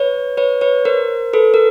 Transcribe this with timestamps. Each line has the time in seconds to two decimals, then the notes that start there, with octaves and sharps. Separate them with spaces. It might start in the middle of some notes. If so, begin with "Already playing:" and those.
Already playing: B4 C#5
0.37 B4 C#5
0.61 B4 C#5
0.85 A#4 C5
1.33 A4 B4
1.54 A#4